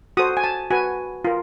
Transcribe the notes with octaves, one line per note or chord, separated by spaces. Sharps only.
F#4 A4 C5 D#6
G#5
A5
F#4 B4 G#5
F4 A#4